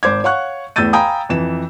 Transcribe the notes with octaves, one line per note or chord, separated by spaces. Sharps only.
G#1 C5 D6 G#6
C#5 F5 F#5 C#6 F#6
E2 A2 E6 G6 A6 D#7
F5 G5 G#5 A#5 B5 D#6
F2 E3 E7